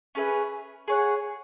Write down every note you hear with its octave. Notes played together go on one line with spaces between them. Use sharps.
C#4 G#4 B4 E5
G#4 C#5 F#5